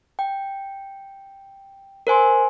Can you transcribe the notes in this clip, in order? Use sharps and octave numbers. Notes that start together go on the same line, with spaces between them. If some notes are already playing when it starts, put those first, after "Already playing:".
G5
A#4 C5 G#5 C6